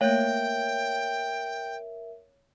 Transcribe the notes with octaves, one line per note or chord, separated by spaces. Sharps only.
A3 A#3 A#4 C#5 E5 F5 G5